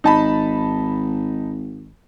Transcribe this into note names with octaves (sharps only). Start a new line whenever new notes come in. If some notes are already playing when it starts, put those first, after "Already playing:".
G#1 D#4 A5 B5